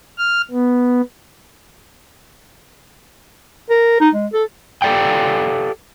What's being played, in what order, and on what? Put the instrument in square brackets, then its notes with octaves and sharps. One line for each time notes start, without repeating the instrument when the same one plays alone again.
[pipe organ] F6
B3
[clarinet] A#4
D#4
G#3
A4
[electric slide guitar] G4 A4 D5 F5 G5